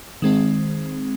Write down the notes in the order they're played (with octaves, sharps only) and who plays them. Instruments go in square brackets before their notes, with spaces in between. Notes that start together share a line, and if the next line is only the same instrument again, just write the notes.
[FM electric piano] D#3 G#3 C4